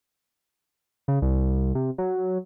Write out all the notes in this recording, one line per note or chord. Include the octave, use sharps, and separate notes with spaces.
C#3
C2
C3
F#3